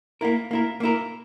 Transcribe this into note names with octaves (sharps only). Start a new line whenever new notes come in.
A#3 E4 A#4
A#3 E4 A#4
A#3 E4 A#4